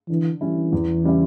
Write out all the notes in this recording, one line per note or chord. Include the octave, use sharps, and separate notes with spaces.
D3 E3
E3 G3 C#4 E4
E2
C#3 G3 C#4 E4